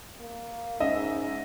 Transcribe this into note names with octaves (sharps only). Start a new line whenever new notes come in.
A#3
G#2 C#4 D#5 E5